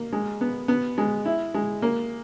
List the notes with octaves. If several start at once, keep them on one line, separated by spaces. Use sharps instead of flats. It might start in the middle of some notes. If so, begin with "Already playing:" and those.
Already playing: A#3
G#3
B3
B3
G#3
E4
G#3
A#3